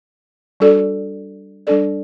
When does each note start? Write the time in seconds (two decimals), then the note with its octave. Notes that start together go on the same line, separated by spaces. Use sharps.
0.60 G3 D4 F#4 A4 D5
1.67 G3 D4 A4 D5